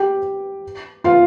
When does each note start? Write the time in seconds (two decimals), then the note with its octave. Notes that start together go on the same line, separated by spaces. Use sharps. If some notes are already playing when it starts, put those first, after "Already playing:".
Already playing: G4 G5
1.04 F4 F5